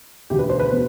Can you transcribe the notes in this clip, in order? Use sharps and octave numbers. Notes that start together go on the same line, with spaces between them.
E1 D2 D3 G4
B4
C5
B4
B2